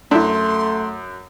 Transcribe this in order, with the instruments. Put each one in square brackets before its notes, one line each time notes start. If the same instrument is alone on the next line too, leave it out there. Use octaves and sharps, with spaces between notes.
[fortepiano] F#2 [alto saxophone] A3 [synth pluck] D4 E4 [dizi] C6